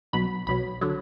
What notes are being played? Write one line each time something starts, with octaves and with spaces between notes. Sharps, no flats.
B1 B2 F#3 B5
B1 B2 F#3 B5
D3 F#3